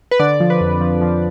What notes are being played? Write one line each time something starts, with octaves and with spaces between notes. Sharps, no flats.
B4
D3 D5
F3
B4
F2
F3
F3